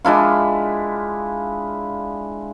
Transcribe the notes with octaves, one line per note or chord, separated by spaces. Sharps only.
G#3 D4 E4 F4